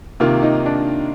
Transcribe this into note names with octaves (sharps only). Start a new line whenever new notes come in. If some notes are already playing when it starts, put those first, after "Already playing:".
C3 D#3 A#3 F4
D#4
D4